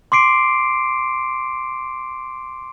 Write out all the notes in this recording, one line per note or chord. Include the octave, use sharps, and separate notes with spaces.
C6 D6 C7 D7